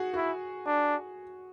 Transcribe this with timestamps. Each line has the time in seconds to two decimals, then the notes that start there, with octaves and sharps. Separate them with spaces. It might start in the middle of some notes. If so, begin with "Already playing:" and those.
Already playing: F#4 G#4
0.14 E4 F#4
0.66 D4